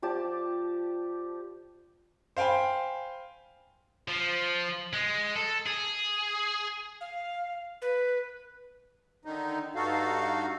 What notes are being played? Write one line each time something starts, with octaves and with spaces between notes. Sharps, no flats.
F3 G4 D5 A5
C5 F5 G5 G#5 B5
F3
G#3
A4
G#4
F5
B4
D3 D#3 D#4
G2 D#4 F#4 A4 F5